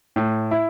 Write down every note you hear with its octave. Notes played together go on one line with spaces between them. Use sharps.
A2
E4